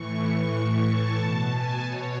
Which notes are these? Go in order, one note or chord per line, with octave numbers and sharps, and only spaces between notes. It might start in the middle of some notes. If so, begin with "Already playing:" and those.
Already playing: A2 E3 C#6
C#6
A2 E3
A5
B2
G#5
B2 C#5